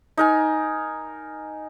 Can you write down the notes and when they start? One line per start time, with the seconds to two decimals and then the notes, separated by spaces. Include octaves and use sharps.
0.17 D#4 A#4 G#5